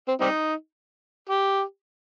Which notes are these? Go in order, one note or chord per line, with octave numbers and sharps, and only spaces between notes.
C4
G3 C4 D#4
G4